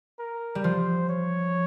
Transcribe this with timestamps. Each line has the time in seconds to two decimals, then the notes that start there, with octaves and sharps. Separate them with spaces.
0.19 A#4
0.55 G3
0.64 F3 C5
1.09 C#5